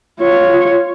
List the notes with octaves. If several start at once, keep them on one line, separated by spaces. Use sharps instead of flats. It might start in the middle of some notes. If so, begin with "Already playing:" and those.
F4 C#5